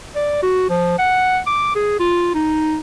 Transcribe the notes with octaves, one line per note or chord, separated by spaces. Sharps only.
D5
F#4
F3
F#5
D6
G#4
F4
D#4